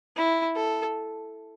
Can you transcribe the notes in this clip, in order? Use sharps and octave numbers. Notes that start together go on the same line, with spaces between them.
E4
A4